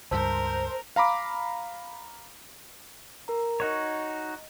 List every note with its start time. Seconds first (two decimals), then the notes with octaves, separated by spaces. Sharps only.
0.11 C#2 G2 A#4 C5 A5 E6 B6
0.96 F5 A#5 B5 D6
3.28 A#4 A#5
3.60 D#4 F#4 C#5 D#5